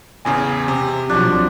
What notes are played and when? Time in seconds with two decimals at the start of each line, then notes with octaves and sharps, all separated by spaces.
0.25 A1 E2 C#3 G#5 D#6
0.68 C3 G4
1.09 B1 F3 F#3 C4 D4 F#4